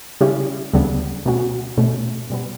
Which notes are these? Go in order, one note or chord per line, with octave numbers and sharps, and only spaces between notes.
C#3 G3 C#4 E4 G4
D2 C#3 G3 B3 D4
B2 A3 C#4 F#4
B2 A3 C#4
B2 G3 B3